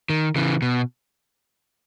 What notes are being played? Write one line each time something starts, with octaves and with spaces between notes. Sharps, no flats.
D#3
C#3 E3
B2